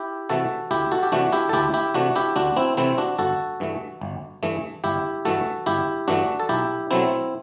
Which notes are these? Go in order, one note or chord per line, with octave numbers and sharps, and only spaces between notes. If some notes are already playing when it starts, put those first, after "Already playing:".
Already playing: E4 G4
C3 E3 A3 F#4 A4
D2 E4 G4
F#4 A4
G4
C3 E3 A3 D4 F#4
E4 G4
A4
D2 E4 G4
E4 G4
C3 E3 A3 D4 F#4
E4 G4
D2 D4 F#4
C4 E4
C3 E3 A3 C4 E4
D4 F#4
G1 F#4 A4
G2 E3 A3
G1
G2 E3 A3
G1 E4 G4
G2 E3 A3 F#4 A4
G1 E4 G4
G2 E3 A3 D4 F#4
A4
B1 E4 G4
B2 F#3 A3 C4 E4